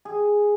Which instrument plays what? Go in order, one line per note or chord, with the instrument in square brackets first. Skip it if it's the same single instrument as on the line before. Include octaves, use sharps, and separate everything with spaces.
[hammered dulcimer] G#4